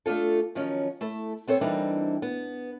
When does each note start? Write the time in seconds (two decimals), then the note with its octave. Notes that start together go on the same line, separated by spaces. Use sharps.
0.06 A3 D4 F4 A4
0.55 D#3 F3 F#3 C#4
1.01 A3 E4 A4
1.48 B3 C4 A4 C#5
1.61 E3 G3 A#3 C4 D4 D#4
2.22 B3